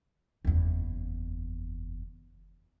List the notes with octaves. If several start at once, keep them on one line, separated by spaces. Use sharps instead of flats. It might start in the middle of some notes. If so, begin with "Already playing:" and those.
F#1 E2